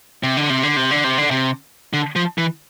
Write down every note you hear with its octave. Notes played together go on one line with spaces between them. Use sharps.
C3
D3
C3
D3
C3
D3
C3
D3
C3
D3
F3
E3